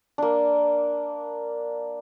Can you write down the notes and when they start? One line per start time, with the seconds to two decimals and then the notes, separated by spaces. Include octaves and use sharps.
0.18 A#3 D4